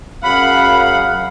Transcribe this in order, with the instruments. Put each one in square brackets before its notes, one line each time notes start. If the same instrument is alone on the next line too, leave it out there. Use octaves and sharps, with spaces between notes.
[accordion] F#2 C#3 F#3 [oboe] F5 [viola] F#5 [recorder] B5